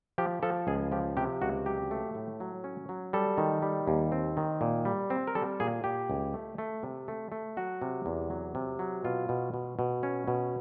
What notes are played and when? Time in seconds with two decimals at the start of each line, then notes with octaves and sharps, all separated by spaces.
0.18 F3 G4
0.43 F3 A4
0.67 C#2 G#4
0.92 F3 G4
1.17 C3 G4
1.42 C#2 F#4
1.66 F#3 G4
1.91 A3
2.15 A2
2.40 F#3
2.64 C#4
2.89 F#3
3.13 G3 A4
3.38 D#3
3.62 G3
3.87 D#2
4.12 C4
4.37 D#3
4.61 A#2
4.85 G3
5.10 C4
5.27 A#4
5.35 G3 A4
5.60 A#2 G#4
5.84 A#2 G4
6.10 C#2
6.34 A3
6.58 A3
6.83 C3
7.08 A3
7.32 A3
7.57 F#3 F#4
7.82 C3
8.06 E2
8.30 F#3
8.55 C3
8.79 F#3
9.04 B2 F4
9.29 B2
9.54 B2
9.79 B2
10.03 C#4
10.28 B2